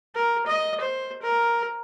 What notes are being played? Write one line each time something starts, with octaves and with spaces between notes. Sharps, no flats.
A#4
D#5
C5
A#4